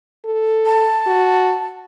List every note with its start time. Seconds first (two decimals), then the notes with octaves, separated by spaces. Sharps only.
0.25 A4
0.66 A5
1.07 F#4